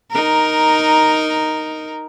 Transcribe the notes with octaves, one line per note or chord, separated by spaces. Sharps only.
D#4 A#4